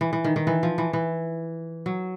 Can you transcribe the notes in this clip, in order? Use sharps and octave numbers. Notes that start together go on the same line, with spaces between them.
E3
E3
D#3
D#3
E3
F3
E3
E3
F#3